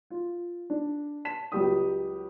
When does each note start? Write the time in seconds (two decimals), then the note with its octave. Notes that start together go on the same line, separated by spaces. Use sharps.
0.10 F4
0.70 D4
1.25 A5 B6 E7
1.52 C#2 F#3 G3 G4 D#6